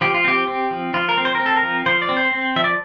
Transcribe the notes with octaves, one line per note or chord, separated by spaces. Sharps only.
F3 G4
F4
C4 G4
C4
F3
F3 F4
A#4
C4
C5
A#4
C4
A4
A#4
F3
F3 C5
D5
C4
C5
C4
F3 E5
D5